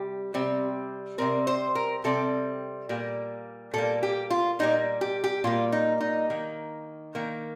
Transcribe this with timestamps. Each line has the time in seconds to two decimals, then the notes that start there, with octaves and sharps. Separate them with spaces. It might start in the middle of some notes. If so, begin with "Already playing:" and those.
Already playing: C3 G3 G4
0.34 C3 G3 C4
1.18 C3 G3 C4 A#4
1.47 C5
1.75 A#4
2.04 C3 G3 C4 A4
2.89 A#2 G3 A#3
3.73 A#2 G3 A#3 A4
4.03 G4
4.30 F4
4.59 A#2 G3 A#3 D#4
5.01 G4
5.24 G4
5.44 A#2 G3 A#3 F4
5.72 D#4
6.00 D#4
6.30 D#3 A#3
7.15 D#3 A#3